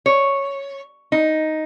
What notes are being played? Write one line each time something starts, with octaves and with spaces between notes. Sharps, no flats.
C#5
D#4